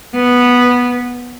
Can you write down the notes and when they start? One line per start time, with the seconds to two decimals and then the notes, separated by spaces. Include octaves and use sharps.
0.15 B3